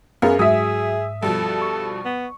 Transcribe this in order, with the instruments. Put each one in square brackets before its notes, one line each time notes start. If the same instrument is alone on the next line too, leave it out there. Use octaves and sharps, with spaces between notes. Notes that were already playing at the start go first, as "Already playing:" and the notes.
[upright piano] F#2 [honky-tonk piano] B3 [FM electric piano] G#4 A#4 F5
[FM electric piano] G#2 [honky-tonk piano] F#3 [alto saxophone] G#4 [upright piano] E5 D#6
[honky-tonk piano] G2 B2 F3 [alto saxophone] A4
[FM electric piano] C#6
[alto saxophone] B3